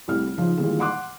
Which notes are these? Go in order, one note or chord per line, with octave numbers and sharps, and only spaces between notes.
C2 A2 G3 F6
C#3 F3 D#4
A#2 D#3 E3 G3 G#3
F#5 C6 D6 F#6